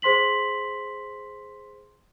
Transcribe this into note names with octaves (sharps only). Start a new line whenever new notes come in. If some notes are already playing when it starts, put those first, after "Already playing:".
G#4 C5 C6 B6 F#7